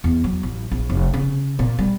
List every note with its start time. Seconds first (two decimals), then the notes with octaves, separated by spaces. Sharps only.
0.04 E2
0.24 F#3
0.43 A1
0.71 A#1
0.90 F1
1.14 C#3
1.59 A#2
1.79 G3